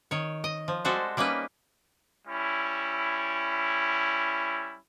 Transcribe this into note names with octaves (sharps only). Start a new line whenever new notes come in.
D#3 C#5
D#5
F3
G3 G#3 F#4 A4 C5
G3 A#3 C#4 D#4 B4
G3 C#4 E4